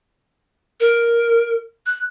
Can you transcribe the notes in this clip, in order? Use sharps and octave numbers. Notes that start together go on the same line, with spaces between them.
A#4
F#6